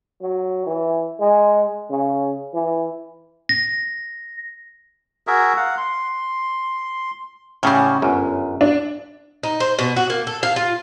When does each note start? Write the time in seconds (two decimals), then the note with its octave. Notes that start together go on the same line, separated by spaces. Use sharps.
0.21 F#3
0.66 E3
1.19 G#3
1.90 C#3
2.54 E3
3.49 A#6
5.27 F#4 G#4 A#4 E5
5.57 F5 F#5
5.77 C6
7.63 A2 C#3 G3 C#4 F#4
8.02 G1 F#2
8.61 D4
9.43 D#4
9.60 C5
9.79 B2
9.96 F#4
10.10 A#3
10.27 A4
10.43 F5
10.56 F4